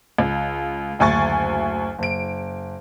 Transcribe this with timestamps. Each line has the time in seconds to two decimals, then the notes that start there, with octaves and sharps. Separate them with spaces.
0.18 C#2
0.99 F#1 D2 G#5 C#6 A6
1.99 F#1 D7